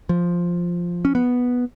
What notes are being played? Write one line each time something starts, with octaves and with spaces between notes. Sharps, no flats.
F3
C#4
B3